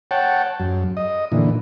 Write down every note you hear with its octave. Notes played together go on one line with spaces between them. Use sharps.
C#5 F#5 G5 A5
F#2
D#5
A#2 D3 E3